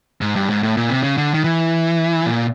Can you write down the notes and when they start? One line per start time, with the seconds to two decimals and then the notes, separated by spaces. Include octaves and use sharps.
0.21 G#2
0.36 G2
0.50 G#2
0.63 A2
0.77 A#2
0.89 C3
1.03 C#3
1.17 D3
1.34 D#3
1.44 E3
2.26 A#2